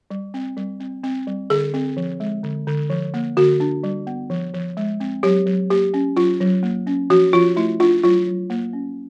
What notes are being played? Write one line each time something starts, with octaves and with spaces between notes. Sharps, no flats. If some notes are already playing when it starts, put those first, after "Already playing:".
G3
C4
G3
C4
C4
G3
D3 G#4
C4
F3
G#3
D3
D3
F3
A#3
D3 F#4
D4
G3
B3
F3
F3
G#3
C4
F#3 G4
F#3
A#3 G4
C#4
F#3 F4
F#3
A#3
C#4
F3 F#4
F3 F4
A3 E4
D4 F4
F#3 F4
F#3
A#3
C#4